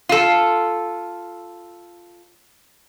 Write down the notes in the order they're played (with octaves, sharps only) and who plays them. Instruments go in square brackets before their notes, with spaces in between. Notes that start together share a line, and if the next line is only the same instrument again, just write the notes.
[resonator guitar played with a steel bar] F4 A4